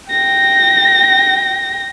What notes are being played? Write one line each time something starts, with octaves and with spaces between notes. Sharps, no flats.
G5 A#6